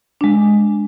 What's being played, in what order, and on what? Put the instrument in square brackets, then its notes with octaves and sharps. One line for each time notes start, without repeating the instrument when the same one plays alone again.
[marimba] G#3 D4